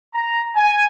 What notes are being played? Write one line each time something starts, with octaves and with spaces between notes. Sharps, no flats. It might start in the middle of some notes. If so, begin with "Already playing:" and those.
A#5
G#5